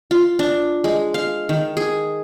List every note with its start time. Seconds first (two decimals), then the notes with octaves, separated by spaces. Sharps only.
0.11 F4
0.39 D4
0.84 G#3
1.14 F5
1.49 D#3
1.77 G#4